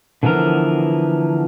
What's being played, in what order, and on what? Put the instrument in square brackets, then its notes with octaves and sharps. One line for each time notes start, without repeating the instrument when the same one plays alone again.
[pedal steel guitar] D3 E3 F3 B3 A#4